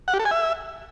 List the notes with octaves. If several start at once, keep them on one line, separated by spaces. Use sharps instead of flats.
F#5
G4
A4
G#5
E5